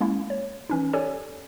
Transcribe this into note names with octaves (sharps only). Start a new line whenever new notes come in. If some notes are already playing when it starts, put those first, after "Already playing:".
G#3 A#3 C#4 E4
C#5
E3 C#4 D#4
G4 A4 C#5 D5 G#5